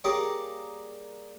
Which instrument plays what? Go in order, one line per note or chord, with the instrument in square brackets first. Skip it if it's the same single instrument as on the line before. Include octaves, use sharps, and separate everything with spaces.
[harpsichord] G3 A#3 G4 G#4 C#5